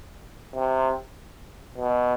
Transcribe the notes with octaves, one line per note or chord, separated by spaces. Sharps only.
C3
B2